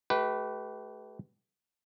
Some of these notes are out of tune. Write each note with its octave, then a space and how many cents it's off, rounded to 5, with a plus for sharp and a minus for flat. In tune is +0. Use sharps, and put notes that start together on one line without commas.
A3 -40 G4 -35 B4 +0